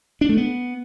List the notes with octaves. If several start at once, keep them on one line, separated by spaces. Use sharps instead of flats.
D4
A3
B3